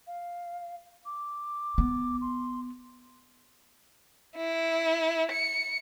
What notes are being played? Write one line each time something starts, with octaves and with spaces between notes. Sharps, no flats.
F5
D6
B3
C6
E4
C#7